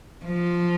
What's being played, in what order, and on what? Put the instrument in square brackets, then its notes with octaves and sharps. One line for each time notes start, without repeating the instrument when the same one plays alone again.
[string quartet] F3